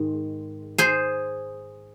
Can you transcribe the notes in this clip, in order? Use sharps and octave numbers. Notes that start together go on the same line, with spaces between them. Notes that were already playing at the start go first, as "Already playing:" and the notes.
Already playing: G#2 D#3 G#3
G#4 C5